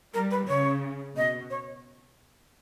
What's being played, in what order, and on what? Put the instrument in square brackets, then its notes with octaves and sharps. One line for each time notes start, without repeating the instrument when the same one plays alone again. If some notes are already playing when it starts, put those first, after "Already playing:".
[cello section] G3 [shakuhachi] A#4
[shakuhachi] B4
[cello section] C#3 [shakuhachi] C#5
[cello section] B2 [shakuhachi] D#5
[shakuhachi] C#5